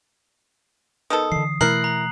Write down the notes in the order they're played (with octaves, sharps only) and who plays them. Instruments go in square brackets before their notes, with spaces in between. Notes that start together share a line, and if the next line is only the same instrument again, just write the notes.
[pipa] D#3 B3 A4 [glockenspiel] D#6
[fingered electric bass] D3 E3 [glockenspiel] C7
[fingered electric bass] B2 E3 A3 [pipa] E4 A#4 [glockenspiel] F#6 C7 F#7
[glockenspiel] A#5